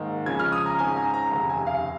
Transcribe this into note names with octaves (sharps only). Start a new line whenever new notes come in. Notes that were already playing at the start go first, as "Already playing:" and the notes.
Already playing: G#2 D#3 A#3
C#2 C#3 F3 C#4 G#6
F6
D#6
A#5
G#1 G#2 G#3 C#4 G#5
A#5
A#5
F1 D#2 C#3 A#5
G#5
F5